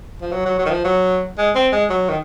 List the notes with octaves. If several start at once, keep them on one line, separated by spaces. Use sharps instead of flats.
F3
F#3
F#3
F#3
D#3
F3
F#3
G#3
C4
G#3
F#3
D#3